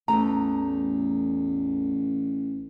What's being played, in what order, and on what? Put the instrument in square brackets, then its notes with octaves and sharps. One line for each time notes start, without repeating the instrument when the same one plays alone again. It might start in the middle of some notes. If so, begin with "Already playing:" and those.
[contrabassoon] A1 [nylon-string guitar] E2 G2 A3 [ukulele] A#5